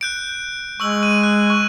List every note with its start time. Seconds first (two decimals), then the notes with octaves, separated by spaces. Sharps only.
0.01 F#6 G6 D7
0.80 G#3 C#6 E6 F#7
1.03 D#7
1.24 F#6
1.50 C#6